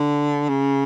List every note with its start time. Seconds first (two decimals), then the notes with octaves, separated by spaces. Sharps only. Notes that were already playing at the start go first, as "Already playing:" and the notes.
Already playing: D3
0.49 C#3